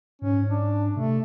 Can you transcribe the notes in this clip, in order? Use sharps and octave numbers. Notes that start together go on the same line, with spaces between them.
G#2 C#4
D4
C3 A3